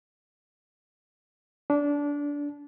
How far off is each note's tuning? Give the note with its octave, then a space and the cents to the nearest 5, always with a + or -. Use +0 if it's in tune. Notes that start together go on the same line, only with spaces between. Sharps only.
D4 -20